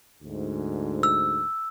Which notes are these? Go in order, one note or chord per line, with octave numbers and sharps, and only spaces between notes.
D2 G#2
E6